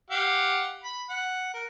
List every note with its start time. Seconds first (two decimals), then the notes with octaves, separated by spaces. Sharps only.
0.10 G4 F5 F#5
0.84 B5
1.10 F#5
1.54 A#4